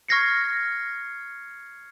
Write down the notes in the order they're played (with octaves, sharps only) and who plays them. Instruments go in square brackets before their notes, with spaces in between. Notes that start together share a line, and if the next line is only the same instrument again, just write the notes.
[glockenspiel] C#6 F6 G#6 A#6 C7 C#7